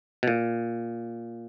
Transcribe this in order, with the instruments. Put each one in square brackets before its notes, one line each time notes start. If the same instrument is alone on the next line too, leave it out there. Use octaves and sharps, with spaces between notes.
[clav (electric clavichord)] B2
A#2